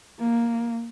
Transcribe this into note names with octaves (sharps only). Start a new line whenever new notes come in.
A#3